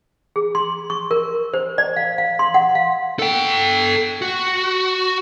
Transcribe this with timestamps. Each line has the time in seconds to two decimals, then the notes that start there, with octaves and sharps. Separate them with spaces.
0.36 G#4
0.55 C6
0.90 C#6
1.11 A#4
1.54 C5
1.78 D5
1.96 F5
2.18 F5
2.39 C6
2.54 F#5
2.75 F5
3.19 A4 G5
4.22 F#4